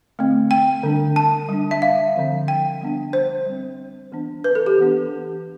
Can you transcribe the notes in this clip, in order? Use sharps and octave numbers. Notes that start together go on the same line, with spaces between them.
D3 A3 C4
G5
D3 G3 D4
A5
G3 D4
E5
F5
D3 F3 C4
G5
G3 B3 D4
C5
G3 C4
E3 B3 D4
B4
A4
G4
E3 B3 D4